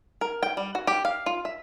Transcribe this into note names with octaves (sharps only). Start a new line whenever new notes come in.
A#4
G5
G3
F#4
G4
F5
F4
E5